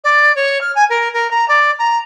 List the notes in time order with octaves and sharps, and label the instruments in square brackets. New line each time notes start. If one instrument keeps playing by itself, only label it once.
[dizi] D5
C#5
F6
G#5
A#4
A#4
A#5
D5
A#5